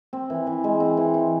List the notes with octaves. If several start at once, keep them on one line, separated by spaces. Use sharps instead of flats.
C4
E3
E3
G#3
C4
E3
E3